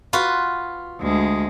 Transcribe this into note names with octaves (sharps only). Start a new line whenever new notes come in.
F4 F#4 B4
D2 G#3